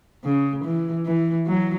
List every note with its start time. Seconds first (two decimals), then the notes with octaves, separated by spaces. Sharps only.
0.24 C#3
0.64 E3
1.05 E3
1.47 F#3